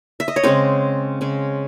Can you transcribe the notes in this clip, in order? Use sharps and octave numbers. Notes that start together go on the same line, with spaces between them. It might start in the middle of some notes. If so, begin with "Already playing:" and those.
E5
D#5
C#5
C#3 G#3 C4 C#4 C5
C#3 G#3 C#4